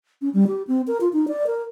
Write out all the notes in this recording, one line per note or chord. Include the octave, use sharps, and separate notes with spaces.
C#4
G3
G4
C4
A#4
F4
D#4
D5
A#4